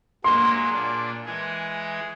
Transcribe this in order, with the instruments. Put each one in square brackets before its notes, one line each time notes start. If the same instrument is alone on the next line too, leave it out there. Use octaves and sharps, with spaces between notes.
[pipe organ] F#3 G#3 A#3 [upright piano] C6
[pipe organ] A#2 D4
E3 G#3 G#4